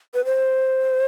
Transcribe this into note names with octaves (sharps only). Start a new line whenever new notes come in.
B4
C5